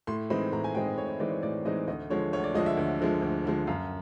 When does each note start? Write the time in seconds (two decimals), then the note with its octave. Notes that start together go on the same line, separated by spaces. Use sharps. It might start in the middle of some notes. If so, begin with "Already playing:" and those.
0.07 A2 C6
0.30 E3 G#3 C4 D#4 B5
0.52 A2 A#5
0.64 G#5
0.75 E3 G#3 C4 D#4 G5
0.86 D#5
0.97 A2 C#5
1.08 C#5
1.20 E3 G#3 C4 D#4 D5
1.31 C#5
1.43 A2 D5
1.65 E3 G#3 C4 D#4 D#5
1.87 D2 D#5
2.10 D3 F3 G#3 C#5
2.33 D2 C#5
2.44 D5
2.54 D3 F3 G#3 D#5
2.66 E5
2.77 D2
3.00 D3 F3 G#3
3.22 D2
3.44 D3 F3 G#3
3.67 F#2 F5